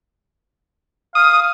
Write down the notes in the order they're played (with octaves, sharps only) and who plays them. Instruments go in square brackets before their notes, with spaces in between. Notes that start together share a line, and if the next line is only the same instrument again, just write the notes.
[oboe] F5 [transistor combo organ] D#6